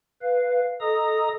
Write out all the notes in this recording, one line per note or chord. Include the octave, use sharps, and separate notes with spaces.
B4 F5
A4 D#5 A#5 D#6